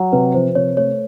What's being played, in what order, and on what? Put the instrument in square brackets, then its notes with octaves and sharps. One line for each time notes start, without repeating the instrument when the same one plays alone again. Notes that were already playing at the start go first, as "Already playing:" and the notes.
Already playing: [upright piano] F#3
[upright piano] C3 [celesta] B4
[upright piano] F3 [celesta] C5
[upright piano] C3 [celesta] C#5
[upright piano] A3 [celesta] C#5